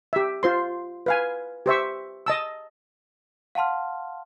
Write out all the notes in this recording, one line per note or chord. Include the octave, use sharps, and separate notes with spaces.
G4 E5
F4 C5 C6
B4 F5 G#5
G4 C5 E5 C#6
D#5 A5 E6
F5 F#5 A5 C6 F6